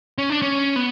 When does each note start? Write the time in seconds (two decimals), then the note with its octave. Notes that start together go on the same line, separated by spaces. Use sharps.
0.18 C#4
0.30 D4
0.42 C#4
0.76 B3